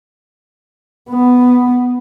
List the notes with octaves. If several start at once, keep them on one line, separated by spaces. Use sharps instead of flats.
B3